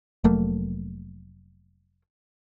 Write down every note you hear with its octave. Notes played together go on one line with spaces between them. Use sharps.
F1 F#3 A3 A#3